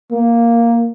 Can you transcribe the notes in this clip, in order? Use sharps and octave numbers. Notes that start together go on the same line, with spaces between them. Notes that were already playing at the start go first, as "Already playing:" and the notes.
A#3